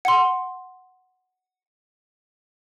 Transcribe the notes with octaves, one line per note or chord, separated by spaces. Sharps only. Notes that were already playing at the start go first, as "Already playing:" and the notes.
F#5 C6